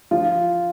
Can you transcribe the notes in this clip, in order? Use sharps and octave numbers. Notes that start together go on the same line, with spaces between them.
F3 F4